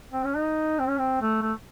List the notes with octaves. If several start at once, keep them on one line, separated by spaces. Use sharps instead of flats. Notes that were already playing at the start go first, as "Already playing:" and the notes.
C4
C#4
D#4
C4
C#4
C4
A3
A3